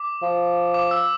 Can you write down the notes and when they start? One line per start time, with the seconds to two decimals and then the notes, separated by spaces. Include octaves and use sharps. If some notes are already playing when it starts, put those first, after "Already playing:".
Already playing: D6
0.22 F3
0.74 D6
0.91 E6